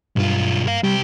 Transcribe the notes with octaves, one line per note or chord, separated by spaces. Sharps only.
B1 G2 F4
A#4 F5
C2 G3 G4